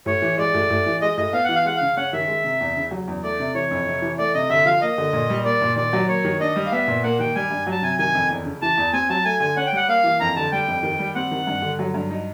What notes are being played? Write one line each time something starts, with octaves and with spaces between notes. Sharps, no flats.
A2 C#5
E3
G#3 D5
A2
A2
E3
G#3 D#5
A2 D#5
B3 F5
E3 F#5
F5
G#3 F#5
C#3 F5
C#4 F#5
D#3 E5
G#3
C3
E2
C#3
F#3
E2
A3 D5
C3
E3 C#5
F2
C3
E3
A3 D5
C3 D#5
D3 E5
F3 F5
A#3 D#5
D3
A#2
G3
A#3 D5
A#2
D#3 D5
F#3
A#3 C#5
D#3
D4 D#5
G3
F5
B3 E5
A#2
A#3 F#5
D#3 G5
G3 G#5
G2
F#3 A5
C3 G#5
D#3 G#5
F2
E2
C#3
E3 A5
E2
C4 G#5
F#3 A5
A3 G#5
D3 G#5
C#4 F#5
G5
G3 F#5
A#3 F5
E3
F2 A#5
D3 A5
G3 G5
F2
D#3
G3
C4 F#5
D#3
G2
D3
F#3
G2
D#4